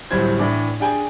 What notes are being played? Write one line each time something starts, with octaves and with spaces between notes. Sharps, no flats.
D1 A2 F#3 G3 C5 G#6
A2 E3 D4 D6
D4 G#4 G5 G#5